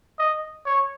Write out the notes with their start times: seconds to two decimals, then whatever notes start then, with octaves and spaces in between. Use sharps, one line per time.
0.19 D#5
0.66 C#5